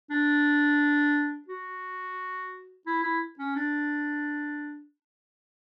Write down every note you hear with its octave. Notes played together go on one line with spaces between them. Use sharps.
D4
F#4
E4
E4
C#4
D4